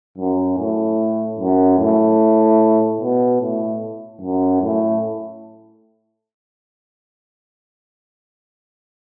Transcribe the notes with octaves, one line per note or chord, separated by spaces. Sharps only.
F#2
A2
F#2
A2
B2
A2
F#2
A2